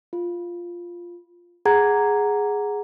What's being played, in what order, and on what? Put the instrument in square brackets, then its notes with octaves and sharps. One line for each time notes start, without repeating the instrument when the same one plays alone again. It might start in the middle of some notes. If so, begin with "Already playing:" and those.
[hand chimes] F4
G#4 F#5 A#5 G#6